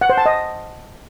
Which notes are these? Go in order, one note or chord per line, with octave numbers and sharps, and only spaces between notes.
F#5
C5
A5
D#5